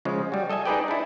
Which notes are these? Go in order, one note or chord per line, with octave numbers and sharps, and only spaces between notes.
C#3 F3 G#3
G3 F#4
A4 D#5 E5 G#5
D#4 G4 G#4 B4 D5 G5
D4 E4